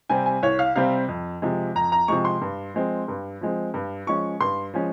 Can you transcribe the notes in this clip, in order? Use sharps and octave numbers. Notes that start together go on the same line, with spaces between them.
C3 G3 C4 G#5
G#5
C2 C#5
F5
C3 G3 C4 F5
F2
C3 F3 G#3
F2 A#5
A#5
C3 F3 G#3 C#6
C6
G2
F3 G#3 C4
G2
F3 G#3 C4
G2
F3 G#3 C#4 C#6
G2 C6
F3 G#3 C#4